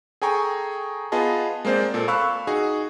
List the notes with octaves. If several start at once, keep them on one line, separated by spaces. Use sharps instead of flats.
G#4 A4 G5 G#5 A#5 C#6
B3 F4 G#4 D#5 A5
G#3 A#3 C4 C5 D5
A#2 A4
F5 B5 C#6 E6 F#6
D#4 F#4 G#4